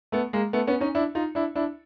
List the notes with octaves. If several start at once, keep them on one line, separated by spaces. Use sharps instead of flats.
A3 B3
G#3 A#3
A3 B3
B3 C#4
C#4 D#4
D4 E4
D#4 F4
D4 E4
D4 E4